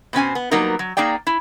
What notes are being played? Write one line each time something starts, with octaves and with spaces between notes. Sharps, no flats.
B2 C4 C#4 G#5
B3
F#3 G3 A#3 B3 D#4 A#4
F#3
A#3 D#4 G#4 D5 G5
E4